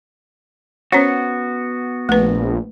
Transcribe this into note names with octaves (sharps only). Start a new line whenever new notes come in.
B3 C#4 F#4 C5 C#5
A#1 A3 B4